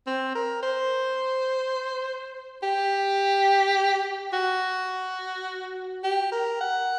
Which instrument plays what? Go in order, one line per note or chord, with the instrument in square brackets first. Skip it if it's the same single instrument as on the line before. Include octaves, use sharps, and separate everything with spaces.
[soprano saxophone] C4
A#4
C5
G4
F#4
G4
A#4
F#5